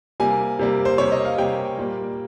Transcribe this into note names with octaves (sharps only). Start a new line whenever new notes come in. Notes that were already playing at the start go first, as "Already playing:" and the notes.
C3 G3 A#3 G#5
C3 G3 A#3
C5
C3 G3 A#3 C#5
D#5
F5
C3 G3 A#3 G5
A#2 G3 A#3